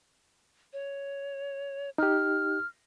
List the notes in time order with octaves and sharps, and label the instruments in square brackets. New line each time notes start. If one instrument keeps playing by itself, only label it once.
[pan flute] C#5
[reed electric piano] D#4 G4 [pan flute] F6